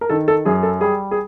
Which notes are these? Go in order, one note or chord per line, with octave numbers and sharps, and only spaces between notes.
A#4
D#3 A4
A4
F#2 G#4
A4
G3 G#4
G#4